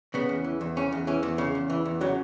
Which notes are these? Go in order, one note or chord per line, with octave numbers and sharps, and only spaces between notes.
C#3 B3
E2
E3
E2
C#3 C#4
E2
E3 C#4
E2
C#3
E2
E3
E2
C#3 F#3